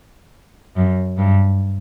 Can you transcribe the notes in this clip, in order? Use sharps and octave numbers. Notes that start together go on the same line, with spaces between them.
F#2
G2